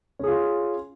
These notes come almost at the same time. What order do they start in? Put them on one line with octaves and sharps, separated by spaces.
C#4 G#4 F4